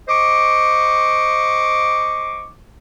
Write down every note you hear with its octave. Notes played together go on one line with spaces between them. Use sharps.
C5 D#5 C#6 D6